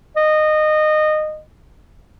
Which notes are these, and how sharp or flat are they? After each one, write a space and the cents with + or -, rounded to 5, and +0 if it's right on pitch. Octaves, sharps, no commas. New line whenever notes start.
D#5 -20